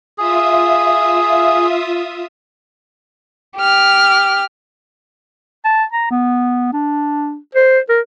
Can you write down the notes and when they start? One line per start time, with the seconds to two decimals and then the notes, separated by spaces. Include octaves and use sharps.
0.18 F4 G#4 E5 D#6
3.57 G4 F6
5.65 A5
5.92 A#5
6.11 B3
6.73 D4
7.55 C5
7.89 A#4